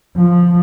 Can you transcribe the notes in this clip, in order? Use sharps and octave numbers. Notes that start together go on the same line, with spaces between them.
F3